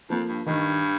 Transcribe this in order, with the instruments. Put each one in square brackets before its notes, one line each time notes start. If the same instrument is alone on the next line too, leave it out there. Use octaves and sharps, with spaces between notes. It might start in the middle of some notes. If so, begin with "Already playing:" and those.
[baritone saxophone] F2 [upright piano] F3 A#3
[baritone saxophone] G2
[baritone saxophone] G2 [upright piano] D#3